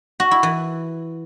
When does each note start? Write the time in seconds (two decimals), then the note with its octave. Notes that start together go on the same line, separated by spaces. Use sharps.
0.20 F#4
0.31 E4
0.43 E3